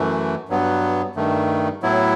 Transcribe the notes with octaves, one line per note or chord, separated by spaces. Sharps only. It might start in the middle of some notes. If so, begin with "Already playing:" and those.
Already playing: F#2 E3 A3
G2 F#3 B3
G2 D#3 A3
A2 F#3 B3 E4